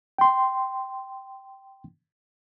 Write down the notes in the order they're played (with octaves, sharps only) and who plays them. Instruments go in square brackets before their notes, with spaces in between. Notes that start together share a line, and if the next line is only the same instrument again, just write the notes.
[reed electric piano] G5 C6